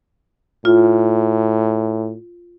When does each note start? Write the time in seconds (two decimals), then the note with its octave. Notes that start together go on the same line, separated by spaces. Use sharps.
0.65 A2 F4